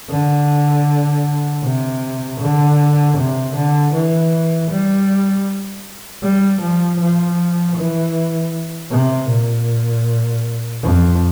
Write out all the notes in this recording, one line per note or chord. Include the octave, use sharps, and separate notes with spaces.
D3
C3
D3
C3
D3
E3
G3
G3
F3
F3
E3
C3
A#2
F2